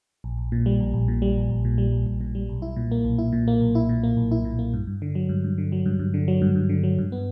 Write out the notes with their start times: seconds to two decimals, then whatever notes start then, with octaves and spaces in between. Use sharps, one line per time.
0.24 A#1
0.38 A#1
0.52 A#2
0.66 G3
0.80 A#1
0.94 A#1
1.08 A#2
1.22 G3
1.37 A#1
1.50 A#1
1.65 A#2
1.78 G3
1.92 A#1
2.06 A#1
2.21 A#2
2.35 G3
2.49 B1
2.62 E4
2.76 A#2
2.92 A#3
3.05 B1
3.19 E4
3.33 A#2
3.48 A#3
3.61 B1
3.75 E4
3.89 A#2
4.03 A#3
4.17 B1
4.32 E4
4.45 A#2
4.59 A#3
4.73 G2
4.87 G2
5.02 D3
5.15 F#3
5.29 G2
5.44 G2
5.58 D3
5.72 F#3
5.86 G2
5.99 G2
6.14 D3
6.28 F#3
6.42 G2
6.55 G2
6.69 D3
6.83 F#3
6.99 G2
7.12 B3